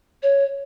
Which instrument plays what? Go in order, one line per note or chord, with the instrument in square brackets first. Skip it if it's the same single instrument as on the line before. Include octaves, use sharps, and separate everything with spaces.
[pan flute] C#5